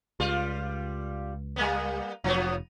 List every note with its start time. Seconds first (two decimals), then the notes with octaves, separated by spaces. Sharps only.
0.20 C#2 G3 F4
1.56 G3 A#3 B3
2.24 F1 F3 F#3 B3